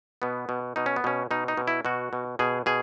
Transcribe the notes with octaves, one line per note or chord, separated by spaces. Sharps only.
B2 B3
B2
B2 D#4
C#4
B3
B2 C#4
B2 D#4
D#4
B2
E4
B2 F#4
B2
B2 G#4
B2 G#4